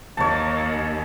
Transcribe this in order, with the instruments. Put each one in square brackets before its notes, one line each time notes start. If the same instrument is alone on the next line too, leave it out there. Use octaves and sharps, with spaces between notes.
[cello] D#2 [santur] C#5 A5